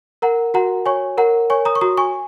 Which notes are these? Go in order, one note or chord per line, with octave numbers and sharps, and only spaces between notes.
A#4 F#5 A#5
F#4 F#5 A#5
C#5 G#5 C#6
A#4 F#5 A#5
C#5 G#5 C#6
A#5 D#6
C#6
F#4 A#5 D#6
G#5 C#6